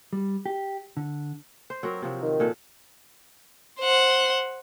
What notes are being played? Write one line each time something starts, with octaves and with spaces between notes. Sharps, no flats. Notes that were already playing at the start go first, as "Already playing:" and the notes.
G3
G4
D3
C5
F#3 C4 A#4
C3 F3 F#3
D#3
A#2 A4 B4
C5 F#5